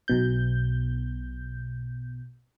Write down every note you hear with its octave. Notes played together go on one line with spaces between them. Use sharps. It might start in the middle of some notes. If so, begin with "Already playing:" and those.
B1 B2 G6